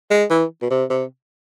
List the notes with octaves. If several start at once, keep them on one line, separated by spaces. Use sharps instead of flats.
G#3
E3
B2
C3
C3